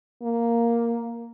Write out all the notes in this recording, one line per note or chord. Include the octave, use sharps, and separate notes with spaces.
A#3